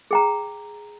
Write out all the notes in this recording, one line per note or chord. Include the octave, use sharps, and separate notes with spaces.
G#4 G5 A#5